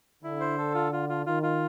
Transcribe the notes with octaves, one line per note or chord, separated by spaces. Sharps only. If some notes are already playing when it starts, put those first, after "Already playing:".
D3 E4
C5
A4
F4
F4
F4
D#3 F4
F4